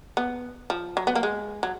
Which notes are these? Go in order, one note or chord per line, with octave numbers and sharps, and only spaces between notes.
B3
F3
F#3
B3
A#3
G#3
F#3